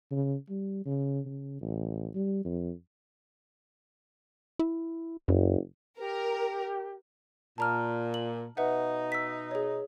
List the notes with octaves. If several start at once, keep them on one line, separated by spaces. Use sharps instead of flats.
C#3
G3
C#3
C#3
A1
G3
F2
E4
F#1 F#2
G4 A#4
A#2 A5 A#5 F6
F#7
B2 D#4 B4 E5 F#5
E6 B6
G#4 C#5